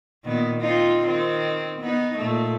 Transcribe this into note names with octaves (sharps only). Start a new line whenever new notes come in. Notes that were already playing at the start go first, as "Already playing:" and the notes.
A#2 D#3 B3
C4 D#4 F4
D#3 C4
B3 D#4
A#2 A3